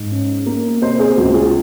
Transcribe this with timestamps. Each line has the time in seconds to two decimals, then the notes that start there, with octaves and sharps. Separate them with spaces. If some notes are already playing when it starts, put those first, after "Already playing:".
Already playing: G#2
0.11 C#4
0.46 A#3
0.82 C3 C5 D#5
0.99 G#4 C5
1.17 C#2 F#4
1.34 F4 G#4